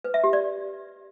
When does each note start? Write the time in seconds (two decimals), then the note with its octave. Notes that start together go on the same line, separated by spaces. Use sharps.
0.04 B4
0.14 E5
0.24 G4
0.33 D5